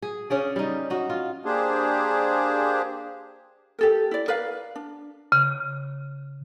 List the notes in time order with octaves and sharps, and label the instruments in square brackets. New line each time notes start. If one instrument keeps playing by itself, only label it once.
[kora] G#4
C#3 C#4 G#4 D5
G3 D#4
D#4 F#4
F4
[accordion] A#3 D4 G4 G#4 C5
[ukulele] G4 A4 A#4
E4 D5
A#4 B4 D5 F5
D4
[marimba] C#3